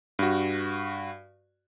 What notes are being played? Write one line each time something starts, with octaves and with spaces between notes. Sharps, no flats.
G2 F#4